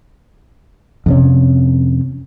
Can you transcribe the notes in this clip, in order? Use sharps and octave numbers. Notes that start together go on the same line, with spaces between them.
F2 C3 C#4